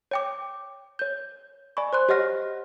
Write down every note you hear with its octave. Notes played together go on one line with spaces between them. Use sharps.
C#5 G5 D6
C#5 G6
D5 G#5 B5 C#6
C5 C6 F#6
G4 C#5 D#5 F#5 F6 A#6